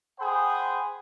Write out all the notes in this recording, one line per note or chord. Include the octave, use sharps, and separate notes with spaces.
G#4 C5 F#5 G5 B5 D#6